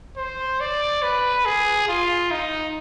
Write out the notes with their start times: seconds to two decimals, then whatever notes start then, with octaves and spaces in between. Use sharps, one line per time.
0.17 C5
0.60 D5
1.03 B4
1.45 G#4
1.88 F4
2.31 D#4